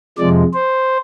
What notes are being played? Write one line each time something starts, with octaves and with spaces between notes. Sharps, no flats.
F2 C3 F3 G#3 D5
C5